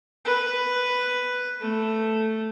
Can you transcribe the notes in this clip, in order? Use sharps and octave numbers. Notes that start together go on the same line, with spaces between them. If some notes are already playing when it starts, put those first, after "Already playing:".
B4
A3